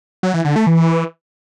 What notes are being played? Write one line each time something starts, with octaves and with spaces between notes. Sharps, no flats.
F#3
E3
D3
A3
E3